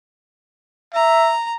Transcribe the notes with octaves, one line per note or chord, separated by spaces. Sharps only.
E5 A#5